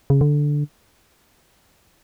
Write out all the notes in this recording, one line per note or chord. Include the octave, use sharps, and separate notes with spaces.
C#3
D3